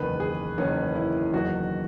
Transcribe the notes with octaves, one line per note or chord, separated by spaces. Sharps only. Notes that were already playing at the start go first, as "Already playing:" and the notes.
Already playing: F#1 E2 D#3 B4
G#4
F#1 E2 D#3 C#4
E4
F#1 E2 D#3 F#3 F#4